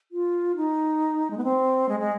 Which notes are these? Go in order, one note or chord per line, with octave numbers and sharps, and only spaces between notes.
F4
D#4
G#3
B3
C4
G#3
G#3